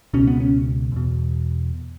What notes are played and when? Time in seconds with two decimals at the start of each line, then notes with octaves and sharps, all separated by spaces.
0.14 C#2 B2 C#4
0.27 B3
0.40 C#4
0.92 E2 B2